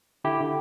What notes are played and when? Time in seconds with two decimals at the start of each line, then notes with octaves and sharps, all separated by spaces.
0.24 D3 E4 G4
0.40 D3